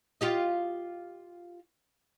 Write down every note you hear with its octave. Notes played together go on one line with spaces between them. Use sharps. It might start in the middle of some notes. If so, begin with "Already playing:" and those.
F4 G4 D#5